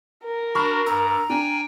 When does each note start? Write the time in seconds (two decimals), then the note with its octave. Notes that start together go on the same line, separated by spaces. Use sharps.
0.24 A#4
0.55 D4 F#4 B5 C#6 F6
0.86 G2 A#5 E6
1.30 D4 G5 G#5